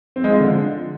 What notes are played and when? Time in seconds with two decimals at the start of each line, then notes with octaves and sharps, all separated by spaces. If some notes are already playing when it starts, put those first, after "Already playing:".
0.16 C4
0.24 G#3
0.32 F4
0.40 D3